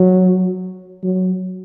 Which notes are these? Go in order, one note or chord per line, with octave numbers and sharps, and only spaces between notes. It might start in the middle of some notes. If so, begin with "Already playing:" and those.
Already playing: F#3
F#3